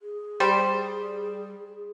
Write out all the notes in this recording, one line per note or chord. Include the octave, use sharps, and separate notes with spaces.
G#4
G3 C5